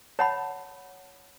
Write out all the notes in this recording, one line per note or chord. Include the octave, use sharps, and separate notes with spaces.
C#5 F#5 A5 B5